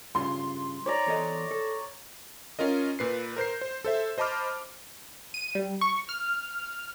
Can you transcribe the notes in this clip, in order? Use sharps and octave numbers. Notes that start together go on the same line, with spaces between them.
G2 C#3 F4 C6
C#5 D5 A#5
E2 A4 D#5
A4
C#4 F4 A#4 D#5
A#2 B4 C7
A#4 C5 G6 C7
C5
A4 C5 E5
C5 D#5 A5 B5 D6 F6
D#7
G3
C#6
F6